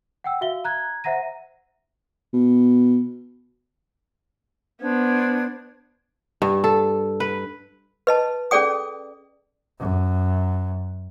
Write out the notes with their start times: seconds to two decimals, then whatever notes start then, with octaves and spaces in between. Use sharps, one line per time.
0.24 F#5 G5 E6
0.41 F#4 E5 F5 G7
0.64 A#5 F#6 G#6
1.04 C5 E5 F#5 A#5 A#6 D#7
2.33 B2
4.82 B3 D4 C5 G#6
6.42 G2
6.64 A4
7.20 B4
8.07 B4 D#5 A5
8.51 C#4 G#4 A4 D5 G5 D#6
9.79 F#2